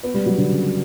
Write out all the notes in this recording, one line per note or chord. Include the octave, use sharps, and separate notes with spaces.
B3
G3
F#3
D3
C#3